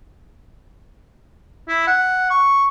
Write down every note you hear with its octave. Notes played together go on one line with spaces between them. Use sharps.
E4
F#5
C#6